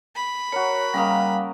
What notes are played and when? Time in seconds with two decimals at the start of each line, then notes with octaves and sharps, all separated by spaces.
0.16 B5
0.52 F#4 A#4 C#5
0.94 C#3 G3 A#3 D#5 F5